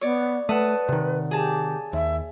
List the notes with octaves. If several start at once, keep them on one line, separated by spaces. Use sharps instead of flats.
B3 C#5 D5
A3 B4 F#5 A5 D#6
C3 D#3
G4 G#4 A5
D#2 E5